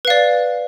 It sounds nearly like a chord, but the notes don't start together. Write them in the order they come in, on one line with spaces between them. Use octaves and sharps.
B4 F5 D5